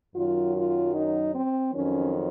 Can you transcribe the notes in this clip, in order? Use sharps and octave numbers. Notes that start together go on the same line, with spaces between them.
F#2 D#3 F#3 F4
F4
D#4
C4
F2 D#3 F#3 C#4